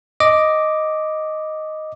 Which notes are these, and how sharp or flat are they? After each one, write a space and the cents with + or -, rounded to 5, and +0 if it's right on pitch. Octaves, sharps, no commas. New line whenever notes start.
D#5 +0 D6 +0